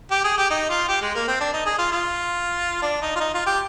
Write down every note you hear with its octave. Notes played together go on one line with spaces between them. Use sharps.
G4
G#4
G4
D#4
F4
G4
G#3
A#3
C4
D4
D#4
G#4
F4
F4
D4
D#4
F4
D#4
F4
G4